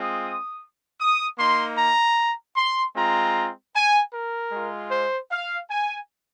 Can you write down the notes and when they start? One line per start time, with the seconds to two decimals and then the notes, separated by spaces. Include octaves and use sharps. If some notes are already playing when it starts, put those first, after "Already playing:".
Already playing: G#3 C4 F4 D#6
1.00 D#6
1.38 A#3 D#4 C6
1.78 A#5
2.57 C6
2.95 G#3 C4 F4 A#5
3.74 G#5
4.13 A#4
4.52 G#3 F4
4.91 C5
5.31 F5
5.70 G#5